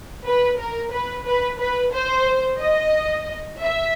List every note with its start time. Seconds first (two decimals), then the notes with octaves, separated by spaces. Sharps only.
0.25 B4
0.58 A#4
0.91 B4
1.26 B4
1.59 B4
1.93 C5
2.60 D#5
3.60 E5